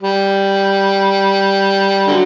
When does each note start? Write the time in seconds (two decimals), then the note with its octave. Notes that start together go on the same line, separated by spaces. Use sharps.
0.02 G3
2.07 D3 F#3